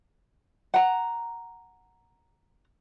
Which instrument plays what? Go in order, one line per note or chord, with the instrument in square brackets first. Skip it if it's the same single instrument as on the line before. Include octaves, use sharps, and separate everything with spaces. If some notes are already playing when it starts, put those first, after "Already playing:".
[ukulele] F#5 A#5